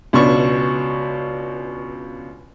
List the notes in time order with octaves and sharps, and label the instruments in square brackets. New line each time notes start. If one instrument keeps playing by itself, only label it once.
[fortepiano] C#2 B2 D4 C#6